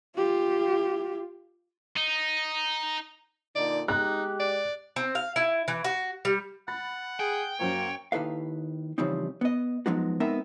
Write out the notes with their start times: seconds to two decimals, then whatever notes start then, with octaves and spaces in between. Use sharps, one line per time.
0.16 F4 G4
1.96 D#4
3.56 A#2 D3 D#4 D5
3.88 G#3 D#4 G4 F#6
4.40 D5
4.96 C4
5.15 F5
5.36 E4
5.68 E3
5.84 F#4
6.25 G3
6.68 F#5 B5 A6
7.20 G#4 G5
7.60 F#2 F#3 A#3 C5 C#5
8.12 D#2 D#3 E4 A4 B4 F5
8.98 C#3 E3 F3 G3 C4 D#4
9.41 B3 D#5
9.86 F3 F#3 G#3 B3 D#4 F#4
10.20 G#3 B3 C4 D#4 A#4 E5